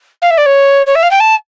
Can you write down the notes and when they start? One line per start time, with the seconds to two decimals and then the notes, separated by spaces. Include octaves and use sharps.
0.21 F5
0.30 E5
0.37 D5
0.45 C#5
0.86 C#5
0.95 E5
1.02 F5
1.11 G5
1.20 A5